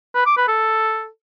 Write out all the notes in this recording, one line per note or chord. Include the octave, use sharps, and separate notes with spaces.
B4
D6
B4
A4